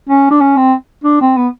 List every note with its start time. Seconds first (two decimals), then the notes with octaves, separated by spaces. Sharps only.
0.09 C#4
0.31 D4
0.41 C#4
0.57 C4
1.04 D4
1.21 C4
1.36 B3